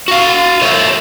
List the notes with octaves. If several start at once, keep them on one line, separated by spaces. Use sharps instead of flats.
F#4 F5
C5 C#5 E5